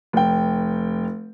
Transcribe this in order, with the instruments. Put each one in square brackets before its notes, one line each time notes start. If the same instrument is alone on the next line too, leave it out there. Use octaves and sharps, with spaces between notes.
[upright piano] F1 G5